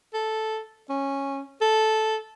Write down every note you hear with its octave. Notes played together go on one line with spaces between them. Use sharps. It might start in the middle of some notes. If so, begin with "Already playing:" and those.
A4
C#4
A4